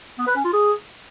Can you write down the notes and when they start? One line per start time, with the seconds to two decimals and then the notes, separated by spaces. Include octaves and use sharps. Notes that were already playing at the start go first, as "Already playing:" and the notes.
0.19 B3
0.27 B4
0.36 C#4
0.45 F4
0.53 G#4